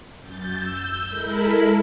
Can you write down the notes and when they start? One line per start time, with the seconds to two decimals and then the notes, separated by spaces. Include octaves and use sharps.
0.20 F#2 G6 A6
0.53 E6 G6
1.08 G#3 E4 A4 A#4 B5